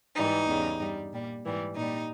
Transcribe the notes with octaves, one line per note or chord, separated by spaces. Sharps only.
G#2 E3 G3 D#4
E2 C#3 G3
G2 G3
A#2 G3
G#2 E3 G3
A#2 G3 D#4